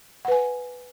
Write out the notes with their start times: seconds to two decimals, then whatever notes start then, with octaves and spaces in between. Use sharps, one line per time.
0.25 F#5
0.28 B4
0.32 G#5